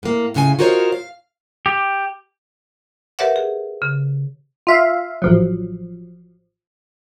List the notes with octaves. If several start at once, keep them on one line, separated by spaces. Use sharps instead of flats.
A2 A#3
F2 A2 C#3 A4 G#5
F4 F#4 A#4 C5 C#5 D#5
F5
G4
G4 A#4 B4 C#5 E5 F#5
G#4
C#3
F4 E5 F5
A1 F3 F#3